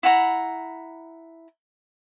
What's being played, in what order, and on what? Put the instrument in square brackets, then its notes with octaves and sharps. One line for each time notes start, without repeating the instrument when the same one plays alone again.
[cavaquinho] E4 F#5 A#5